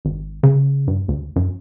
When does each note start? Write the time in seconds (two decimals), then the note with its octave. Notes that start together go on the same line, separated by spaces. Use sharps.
0.05 G#1
0.43 C#3
0.88 G2
1.08 D2
1.36 F#2